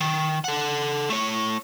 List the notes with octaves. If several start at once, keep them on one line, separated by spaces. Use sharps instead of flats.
D#3
A4 F#5
A3 C#5